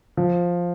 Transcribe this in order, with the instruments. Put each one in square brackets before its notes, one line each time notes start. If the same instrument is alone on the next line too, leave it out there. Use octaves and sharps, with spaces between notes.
[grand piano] F3